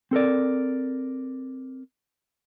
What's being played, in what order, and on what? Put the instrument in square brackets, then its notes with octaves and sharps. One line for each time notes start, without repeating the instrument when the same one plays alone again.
[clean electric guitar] C4 A4 A#4 D5